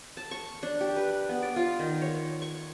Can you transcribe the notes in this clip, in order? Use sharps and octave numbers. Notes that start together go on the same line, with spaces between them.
A5
C#6
D4
G4
B4
B3
D5
F4
D#3
C#5
C#6